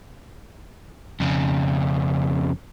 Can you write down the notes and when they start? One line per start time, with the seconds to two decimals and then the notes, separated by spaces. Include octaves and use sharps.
1.20 F2 C#3